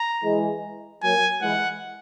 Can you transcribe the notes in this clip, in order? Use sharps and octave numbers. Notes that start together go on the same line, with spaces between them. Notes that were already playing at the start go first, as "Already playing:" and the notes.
Already playing: A#5
E3 G#3
F#3 A#3 G#5
E3 G#3 F#5